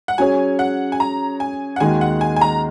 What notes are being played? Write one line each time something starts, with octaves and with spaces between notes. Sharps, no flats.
F#5
F#3 C#4 G#4 C#5 G#5
F#5
G#5
A#5
G#5
F#5
D#2 D#3 G#3 D#4 F#4 G#5
F#5
G#5
G#5
A#5